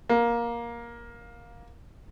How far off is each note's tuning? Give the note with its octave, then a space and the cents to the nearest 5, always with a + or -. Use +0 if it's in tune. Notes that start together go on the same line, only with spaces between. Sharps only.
A#3 +15